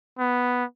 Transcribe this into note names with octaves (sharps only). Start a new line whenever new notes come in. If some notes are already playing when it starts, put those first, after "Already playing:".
B3